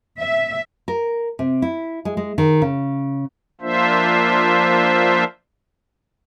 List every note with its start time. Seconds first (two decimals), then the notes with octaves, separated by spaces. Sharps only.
0.21 E5
0.88 A#4
1.39 C3
1.62 E4
2.05 G#3
2.17 G#3
2.38 D#3
2.62 C#3
3.61 F3 A#3 D4 F4 C5 E5